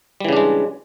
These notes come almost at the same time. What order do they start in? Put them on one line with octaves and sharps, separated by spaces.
G3 E3 C#3 D4 G#3